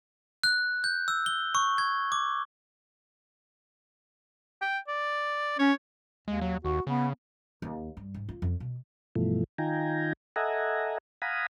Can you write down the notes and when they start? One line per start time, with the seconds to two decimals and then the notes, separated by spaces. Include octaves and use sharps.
0.44 F#6
0.84 G6
1.08 E6
1.26 G7
1.55 C#6
1.78 G#6
2.12 D6
4.61 G5
4.88 D5
5.59 C#4 C#5
6.28 D#2 G#3
6.41 F#3
6.65 D#2 F#4
6.87 C#3 B3
7.62 D#2
7.97 G2
8.14 G#2
8.29 F4
8.42 F2
8.60 B2
9.16 G2 B2 E3 F3 A3
9.58 D#3 D#4 F4 G5 G#5 A#5
10.36 A4 D#5 E5 F#5 G#5 A#5
11.22 F5 F#5 G#5 A#5 B5 D#6